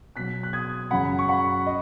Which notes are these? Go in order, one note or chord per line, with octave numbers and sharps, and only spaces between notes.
B2 F#3 F#6 B6
F#6
D#6 G#6
F#2 C#3 F#3 F#5 B5
C#6
F#5 B5
D#5